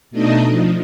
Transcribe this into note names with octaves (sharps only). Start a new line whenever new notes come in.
B2 A3 D4 D#4 D#5
F3